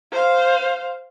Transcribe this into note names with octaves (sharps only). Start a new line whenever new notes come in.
C5 F5